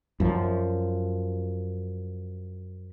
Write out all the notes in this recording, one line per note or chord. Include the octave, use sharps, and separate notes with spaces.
F#2 F3